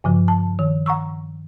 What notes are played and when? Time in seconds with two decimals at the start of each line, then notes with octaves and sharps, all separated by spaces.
0.04 G2 C#3 F3
0.28 A5
0.59 D#3
0.86 F#5 A#5 C#6 E6